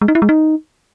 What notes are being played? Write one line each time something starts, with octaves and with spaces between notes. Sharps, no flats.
G#3
D#4
E4
G#3
D#4